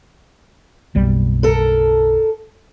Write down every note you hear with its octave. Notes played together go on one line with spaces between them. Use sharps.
F#1 B1 G3
A4 A#4